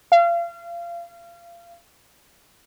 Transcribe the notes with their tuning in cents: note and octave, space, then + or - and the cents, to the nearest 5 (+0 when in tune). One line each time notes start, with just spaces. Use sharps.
F5 -30